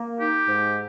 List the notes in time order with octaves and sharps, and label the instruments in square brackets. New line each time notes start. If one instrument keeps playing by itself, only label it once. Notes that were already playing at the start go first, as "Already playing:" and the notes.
Already playing: [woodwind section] A#3
[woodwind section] D#4 [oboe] G4
[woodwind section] G#2